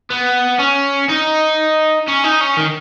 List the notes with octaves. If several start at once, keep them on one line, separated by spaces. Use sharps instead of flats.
B3
C#4
D#4
C#4
D#4
C#4
D#3